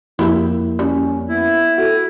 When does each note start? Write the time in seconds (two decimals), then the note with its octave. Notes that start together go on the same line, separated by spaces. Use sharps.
0.19 F2 A#3 E4 G4 E5
0.79 G3 C#4
1.29 B3 E4
1.78 F#4 A4